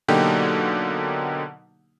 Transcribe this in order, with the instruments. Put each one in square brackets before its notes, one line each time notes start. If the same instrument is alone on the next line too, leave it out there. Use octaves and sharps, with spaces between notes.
[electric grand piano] B2 D3 F#3 A#3 D#4 G4